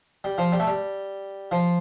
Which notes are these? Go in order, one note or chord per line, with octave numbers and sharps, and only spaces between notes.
G3
F3
G3
A3
G3
F3